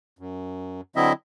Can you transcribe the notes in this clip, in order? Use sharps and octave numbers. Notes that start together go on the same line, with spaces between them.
F#2
D3 F#3 C4 E4 D#5 E5